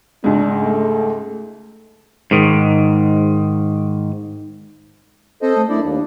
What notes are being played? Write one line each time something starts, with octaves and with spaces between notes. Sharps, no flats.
C#2 G#2 D4
A3
G#2 D#3
C4 A4 C5 D#5
A3
F#2 D4 E4 D5
D#2